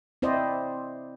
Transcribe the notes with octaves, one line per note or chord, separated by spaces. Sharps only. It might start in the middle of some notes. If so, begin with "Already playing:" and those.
C4 E4 C5 D5 D#5